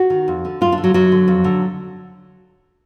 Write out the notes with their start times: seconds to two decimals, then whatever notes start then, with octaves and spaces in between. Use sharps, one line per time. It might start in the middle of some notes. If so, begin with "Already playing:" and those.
Already playing: F#4
0.10 D#3
0.28 F2
0.45 D3
0.61 F#2 F4
0.72 D4
0.78 D3
0.84 F#3
0.94 F#2 F#3
1.12 D3
1.28 F2
1.44 D3